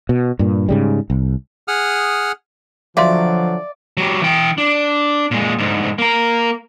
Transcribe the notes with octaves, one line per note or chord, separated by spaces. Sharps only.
B2
G2 A#2
G#2 C#3 G3
C2
G#4 F#5 D#6 F6
D3 F3 F#3 D5 E5 F5 C6
F#3 G4
E3 G5
D4
A#2 G#3
D2 G#2
A#3 A#5